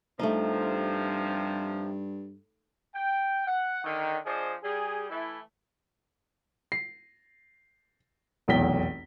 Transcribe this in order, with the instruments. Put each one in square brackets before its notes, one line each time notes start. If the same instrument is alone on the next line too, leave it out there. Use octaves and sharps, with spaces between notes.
[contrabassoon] G2 [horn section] C3 F3 [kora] A3 D#4
[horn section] G5
F#5
D3 D#3
F3 D4 G#4 C5 D#5
G3 G#4
E3 A3 E4
[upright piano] C7
F1 B1 E2 G5 B6 G7